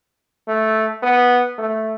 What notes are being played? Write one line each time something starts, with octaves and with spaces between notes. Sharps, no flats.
A3
B3
A3